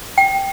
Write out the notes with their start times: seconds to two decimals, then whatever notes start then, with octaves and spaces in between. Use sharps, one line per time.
0.18 G5